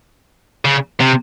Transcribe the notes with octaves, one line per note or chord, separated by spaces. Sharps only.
C#3
C3